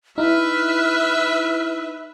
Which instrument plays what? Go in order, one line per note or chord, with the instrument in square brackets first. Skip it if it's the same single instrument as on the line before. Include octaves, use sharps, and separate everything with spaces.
[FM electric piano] D#4 E4 [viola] B4 E5 [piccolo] F6